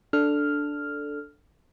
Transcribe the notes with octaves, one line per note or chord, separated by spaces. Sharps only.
D4 A4 F6